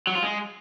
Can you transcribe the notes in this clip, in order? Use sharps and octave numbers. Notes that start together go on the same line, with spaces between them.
F#3
F4
G#3